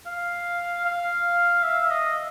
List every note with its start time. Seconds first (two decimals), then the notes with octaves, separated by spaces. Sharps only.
0.06 F5
0.85 F5
1.63 E5
1.90 D#5